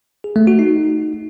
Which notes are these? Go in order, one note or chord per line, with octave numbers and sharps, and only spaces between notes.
G#4
A3
F#4
D#4